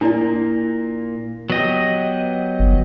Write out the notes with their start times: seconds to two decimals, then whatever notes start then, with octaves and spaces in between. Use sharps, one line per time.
0.01 A#2 A#3 D4 E4 D5
1.50 F#3 B3 G4 D#5
2.59 G1